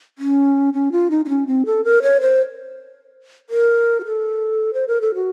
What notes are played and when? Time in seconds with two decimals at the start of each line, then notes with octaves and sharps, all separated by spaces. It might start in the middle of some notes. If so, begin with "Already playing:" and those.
0.18 C#4
0.74 C#4
0.92 F4
1.10 D#4
1.25 D#4
1.29 C#4
1.47 C4
1.66 A4
1.84 A#4
2.02 C#5
2.21 C5
3.50 A#4
4.00 F#4
4.05 A4
4.74 C5
4.88 A#4
5.01 A4
5.15 F#4